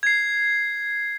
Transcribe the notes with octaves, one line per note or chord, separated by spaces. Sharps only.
G#6 C7